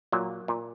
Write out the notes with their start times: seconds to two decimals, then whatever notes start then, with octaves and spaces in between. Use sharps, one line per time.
0.12 A#2 F#3 A#3
0.48 A#2